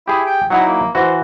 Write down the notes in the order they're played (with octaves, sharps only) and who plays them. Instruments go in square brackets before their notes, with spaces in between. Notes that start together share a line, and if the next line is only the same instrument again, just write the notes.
[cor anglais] E4 [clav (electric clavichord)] G4 G#4
[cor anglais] G5
[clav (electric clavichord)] F#3 D#4 E4 [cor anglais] F#5
[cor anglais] A#3
[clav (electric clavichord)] E3 F#4 [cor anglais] C5